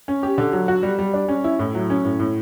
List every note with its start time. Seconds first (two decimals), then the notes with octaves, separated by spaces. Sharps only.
0.08 C#4
0.23 G4
0.38 D3
0.53 F#3
0.68 F#4
0.83 G3
0.99 G3
1.14 D4
1.28 C#4
1.44 E4
1.59 A2
1.75 F#3
1.90 C#4
2.05 A2
2.19 A2